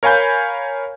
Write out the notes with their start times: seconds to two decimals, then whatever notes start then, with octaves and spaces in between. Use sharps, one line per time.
0.03 A#4 C#5 F5 G#5 B5 G6